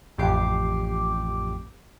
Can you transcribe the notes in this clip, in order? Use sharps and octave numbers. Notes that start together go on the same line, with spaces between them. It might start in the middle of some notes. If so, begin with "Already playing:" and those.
A1 F2 G4 D6 C7